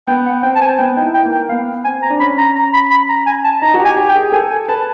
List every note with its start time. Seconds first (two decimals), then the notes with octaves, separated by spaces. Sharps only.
0.07 B3 G5
0.26 F#5
0.43 C4 G5
0.55 A5
0.61 G#5
0.78 B3 G5
0.96 D#4 G5
1.02 E4
1.14 G5
1.25 A#3
1.32 G5
1.49 B3 F5
1.85 C4 G#5
2.02 A#5
2.10 D4
2.20 C#4 B5
2.38 A#5
2.55 A#5
2.74 B5
2.91 B5
3.09 A#5
3.26 G#5
3.44 A5
3.62 D#4 A#5
3.74 F#4
3.80 G4
3.85 G#5
3.97 G4
4.09 G5
4.15 G#4
4.32 A4 G#5
4.50 G#5
4.68 B4 A5